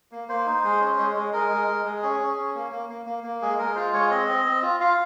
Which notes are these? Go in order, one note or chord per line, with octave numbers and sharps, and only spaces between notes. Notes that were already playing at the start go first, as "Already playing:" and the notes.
A#3
A#3 C5
D#4
G#3
C#4
G#3
G#3
G#3 A#4
G#3
G#3
G#3
C#4 G#4
C#4
C#4
A#3
A#3
A#3
A#3
A#3
G#3 G#4
G#3 A#4
F4 C5
G#3 C#5
C4 D#5
C4
C4
F4
F4 F5